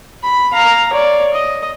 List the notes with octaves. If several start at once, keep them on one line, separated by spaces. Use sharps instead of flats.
B5
F5 A#5
C#5 D5
D#5